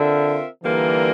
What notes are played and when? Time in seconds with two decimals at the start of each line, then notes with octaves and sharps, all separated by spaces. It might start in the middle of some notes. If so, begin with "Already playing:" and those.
Already playing: D3 C4 F4 A#4 E5
0.64 D3 E3 G3 A#3 F4 A#4